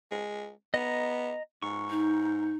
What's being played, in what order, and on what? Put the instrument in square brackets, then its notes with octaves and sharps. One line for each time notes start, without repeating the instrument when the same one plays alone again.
[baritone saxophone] G#3
[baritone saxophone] B3 [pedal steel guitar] D#5 A#5
[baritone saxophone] G#2 [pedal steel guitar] C#6
[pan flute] D#4